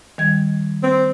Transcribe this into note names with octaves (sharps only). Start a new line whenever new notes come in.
D#3 G3 G#6
C4